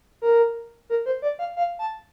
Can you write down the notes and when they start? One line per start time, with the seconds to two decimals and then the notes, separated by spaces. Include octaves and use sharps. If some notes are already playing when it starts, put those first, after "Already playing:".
0.22 A#4
0.90 A#4
1.06 C5
1.22 D5
1.39 F5
1.56 F5
1.79 A5